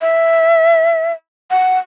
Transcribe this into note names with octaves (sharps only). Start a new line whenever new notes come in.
E5
F#5